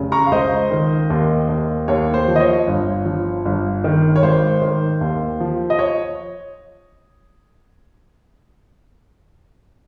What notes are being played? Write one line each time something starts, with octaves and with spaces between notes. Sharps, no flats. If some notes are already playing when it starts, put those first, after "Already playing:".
Already playing: F1 C#3
A#5 C#6
F5
C#2 C5 D#5
D#3
D#2
D#2
D#2 C#5
C5
F3
D#5
C#5
G1
F3
G1
D#3
C#5
G#1 C5
D#3
D#2
F3
D#5
C#5